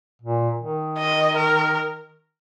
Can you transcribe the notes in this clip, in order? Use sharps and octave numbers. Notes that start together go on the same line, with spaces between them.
A#2
D#3
D#5
A#4